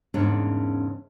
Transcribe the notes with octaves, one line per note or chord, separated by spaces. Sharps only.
E2 G#2 C#3 A#3 C#4 D4